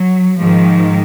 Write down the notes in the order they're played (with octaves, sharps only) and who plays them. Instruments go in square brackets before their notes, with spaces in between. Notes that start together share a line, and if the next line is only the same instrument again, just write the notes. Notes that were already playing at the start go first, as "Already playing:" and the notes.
Already playing: [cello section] F#3
G#2 D#3 F3